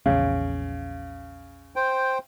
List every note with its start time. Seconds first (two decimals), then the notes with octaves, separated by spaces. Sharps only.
0.06 A#1 E2 C#3
1.76 C5 G5